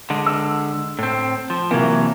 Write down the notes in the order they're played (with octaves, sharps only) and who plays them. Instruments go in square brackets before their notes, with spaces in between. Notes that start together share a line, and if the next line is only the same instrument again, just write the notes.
[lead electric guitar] D3 G#3
[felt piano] E6
[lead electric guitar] A2 C4
F3
[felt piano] C3 A#3 [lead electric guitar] E3 F#3